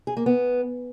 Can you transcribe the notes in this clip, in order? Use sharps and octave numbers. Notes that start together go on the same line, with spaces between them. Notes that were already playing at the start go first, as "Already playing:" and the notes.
G#4
A#3
B3